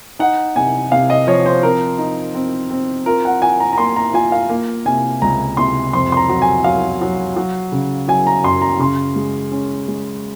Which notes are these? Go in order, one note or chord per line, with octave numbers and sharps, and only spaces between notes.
D#4 F#5
C3 G#5
C3 F5
D#5
F3 C#5
C5
C4 A#4
D#4
C4
C4
F4 A#4
F#5
F4 G#5
A#5
A#5
A#3 C6
A#5
F4 G#5
F5
A#3
C3 G#5
C#2 A#5
C3 C6
F2 C6
C6
A#5
F#3 A#5
G#5
F#3 F5
F#3
F#3
C#3
F#3 G#5
A#5
F#2 C6
A#5
C#3 C6
G#3
C#4
G#3